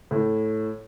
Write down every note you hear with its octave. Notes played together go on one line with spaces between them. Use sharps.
A2